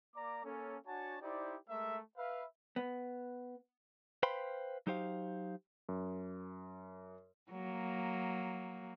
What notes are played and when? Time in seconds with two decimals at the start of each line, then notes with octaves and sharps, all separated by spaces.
0.15 A#3 D5 A#5 D6
0.44 A#3 C#4 A4
0.86 D4 F#4 C#5 F#5 G#5 A5
1.22 D#4 E4 G4 C5 D5
1.69 G#3 A3 A#4 E5
2.18 B4 E5 F5
2.76 B3
4.23 B4 C5 F5 G5 B5 C6
4.87 F#3 D#4 G4 C5 F5
5.89 F#2
7.51 F#3 A#3